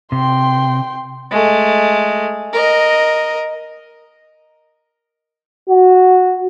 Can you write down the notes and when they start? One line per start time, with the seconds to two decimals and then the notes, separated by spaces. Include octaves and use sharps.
0.12 C3 G5 C6
1.31 G#3 A3
2.53 A#4 D#5
5.69 F#4